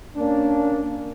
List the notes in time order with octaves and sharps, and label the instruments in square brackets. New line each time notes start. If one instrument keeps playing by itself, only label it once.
[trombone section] A#3 C#4 D4